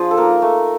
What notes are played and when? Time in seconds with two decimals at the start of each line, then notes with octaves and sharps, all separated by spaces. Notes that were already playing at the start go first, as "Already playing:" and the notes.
Already playing: F3 D4 G#4
0.11 A4
0.17 A#3 D#4 A#4
0.42 A3